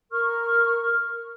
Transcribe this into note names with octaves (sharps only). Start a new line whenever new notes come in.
A#4 C#6 F6